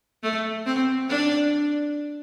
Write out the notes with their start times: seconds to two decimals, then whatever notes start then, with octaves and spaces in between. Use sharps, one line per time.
0.23 A3
0.66 C4
1.08 D4